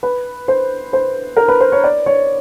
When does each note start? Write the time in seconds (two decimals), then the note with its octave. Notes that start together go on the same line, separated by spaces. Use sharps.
0.03 B4
0.48 C5
0.93 C5
1.37 A#4
1.48 B4
1.60 C5
1.72 C#5
1.84 D5
2.06 C#5